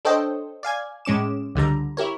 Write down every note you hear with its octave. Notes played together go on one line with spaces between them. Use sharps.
D4 A4 C5 C#5 D#5 G5
D5 F5 G#5 G#6
A2 G#3 C#4 D6 E7
C#2 D3 G3 A#5
E4 G4 A#4 C#5